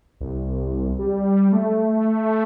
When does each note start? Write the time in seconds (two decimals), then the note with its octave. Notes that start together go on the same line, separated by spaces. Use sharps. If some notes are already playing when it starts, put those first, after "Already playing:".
0.21 C2
0.99 G3
1.52 A3